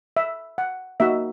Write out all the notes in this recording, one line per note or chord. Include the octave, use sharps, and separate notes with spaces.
E5
F#5
A#3 D#4 F#4 E5